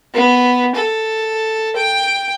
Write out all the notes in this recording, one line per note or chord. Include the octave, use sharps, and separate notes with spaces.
B3
A4
G5